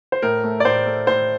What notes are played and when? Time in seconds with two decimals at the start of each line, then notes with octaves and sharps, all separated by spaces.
0.12 C5
0.22 A2 A#4
0.44 A3
0.60 D5
0.65 A2 C5
0.86 A3
1.07 A2 C5